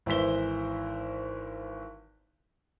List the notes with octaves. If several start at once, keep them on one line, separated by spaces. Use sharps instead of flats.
G#1 E3 E4 C5 B6 G7